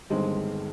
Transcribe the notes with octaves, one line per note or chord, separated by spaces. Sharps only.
G1 G2 D#3 G#3 C4